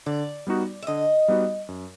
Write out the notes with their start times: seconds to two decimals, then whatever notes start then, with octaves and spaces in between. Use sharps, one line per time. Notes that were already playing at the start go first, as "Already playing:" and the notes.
0.06 D3 D5
0.47 G3 B3 D#4 F#4
0.82 E5
0.87 D3 D#5
1.28 G3 B3 D#4 F#4
1.68 F#2